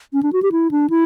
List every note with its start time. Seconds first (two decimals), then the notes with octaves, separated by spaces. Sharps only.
0.13 C#4
0.23 D4
0.33 F#4
0.42 G4
0.52 E4
0.71 D4
0.90 E4